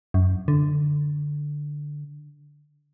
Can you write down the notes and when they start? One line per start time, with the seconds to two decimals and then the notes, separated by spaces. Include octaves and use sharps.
0.14 F#2
0.48 D3